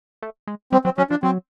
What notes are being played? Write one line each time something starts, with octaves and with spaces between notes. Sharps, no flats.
A3
G#3
G3 C4
F#3 C4
F#3 C#4
F3 D4
F#3 C4